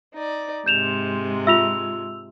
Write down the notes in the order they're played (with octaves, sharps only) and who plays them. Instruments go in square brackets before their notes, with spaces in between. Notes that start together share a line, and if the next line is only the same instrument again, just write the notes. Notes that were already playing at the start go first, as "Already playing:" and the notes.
[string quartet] D#4 D5
[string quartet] G#2 C3 G#3 [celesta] G6 E7 F7
[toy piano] F4 E5 [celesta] E6 F7